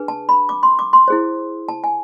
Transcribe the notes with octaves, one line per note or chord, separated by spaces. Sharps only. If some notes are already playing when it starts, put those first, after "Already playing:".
Already playing: D4 G#4 B4
A5
B5
D6
C6
D6
C6
E4 G#4 C5
A5
G#5